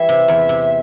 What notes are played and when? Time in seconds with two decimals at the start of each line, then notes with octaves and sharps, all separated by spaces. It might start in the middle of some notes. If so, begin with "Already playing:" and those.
Already playing: E3 G3 E5
0.09 C3
0.28 E2
0.49 C3